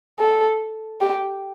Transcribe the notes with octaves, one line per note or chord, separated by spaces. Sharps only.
A4
G4